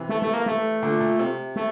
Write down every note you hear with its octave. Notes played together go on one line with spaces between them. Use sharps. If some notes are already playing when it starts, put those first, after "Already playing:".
Already playing: C3 E3
A3
A3
A#3
A3
A#2 D3
A#2
C3
A3